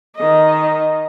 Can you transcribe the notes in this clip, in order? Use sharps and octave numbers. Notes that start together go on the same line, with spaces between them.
D#3 D#5